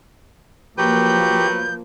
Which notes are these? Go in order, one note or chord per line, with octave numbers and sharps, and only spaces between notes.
F3 F#3 A#3 G4 B4 G6